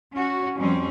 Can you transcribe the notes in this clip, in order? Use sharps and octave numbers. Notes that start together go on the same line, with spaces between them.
C#4 F#4
F2 G3 C4 C#4